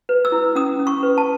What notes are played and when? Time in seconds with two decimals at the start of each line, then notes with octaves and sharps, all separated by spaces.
0.09 B4
0.25 E6
0.32 E4
0.55 C#4 D#6
0.79 C#4
0.87 C#6
1.03 B4
1.18 A5